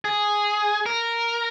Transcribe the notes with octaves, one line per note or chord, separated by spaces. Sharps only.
G#4
A#4